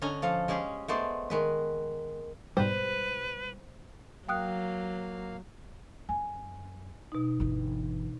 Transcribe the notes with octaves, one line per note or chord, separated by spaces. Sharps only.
D3 C#4 D#5 G#5 A#5
F3 A4 F5
G#3 C#4 G4 G#4
G#3 A3 B3 C5 D5
D#3 G#3 B4
G#2 B2 G3 B4 C5
F#3 A#3 F5 G5 D#6 F#6
F#2 G#5
B2 D#4
G1 E3